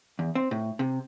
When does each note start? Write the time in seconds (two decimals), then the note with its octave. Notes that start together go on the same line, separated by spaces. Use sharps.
0.19 E2
0.35 C4
0.51 A2
0.79 C3